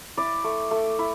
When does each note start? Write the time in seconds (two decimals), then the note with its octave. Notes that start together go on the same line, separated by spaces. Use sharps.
0.17 E4 D5
0.44 A3
0.71 A3
0.99 E4